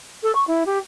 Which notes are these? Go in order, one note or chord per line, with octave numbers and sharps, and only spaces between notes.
A4
C#6
E4
G4